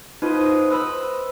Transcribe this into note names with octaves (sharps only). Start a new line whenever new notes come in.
D#4 F4 B4 C5 D#5
B4 C5 D#5 B5 E6